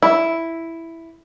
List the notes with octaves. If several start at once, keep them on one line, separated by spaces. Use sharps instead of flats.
E4